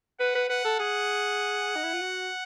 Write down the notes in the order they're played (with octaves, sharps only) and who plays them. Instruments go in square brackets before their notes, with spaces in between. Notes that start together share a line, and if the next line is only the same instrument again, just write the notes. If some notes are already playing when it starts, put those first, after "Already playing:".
[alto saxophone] B4 [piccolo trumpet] F#5
[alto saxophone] B4
[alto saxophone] B4 [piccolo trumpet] F#5
[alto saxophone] A4
[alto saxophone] G#4 [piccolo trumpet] F#5
[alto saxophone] D#4
E4
F4
F#4